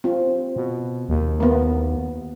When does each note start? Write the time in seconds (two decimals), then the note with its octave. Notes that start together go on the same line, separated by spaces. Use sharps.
0.04 C4 F4
0.56 B2
1.09 D#2
1.40 A#3 B3